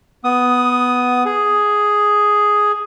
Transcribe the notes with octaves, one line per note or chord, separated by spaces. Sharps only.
B3 D#6
G#4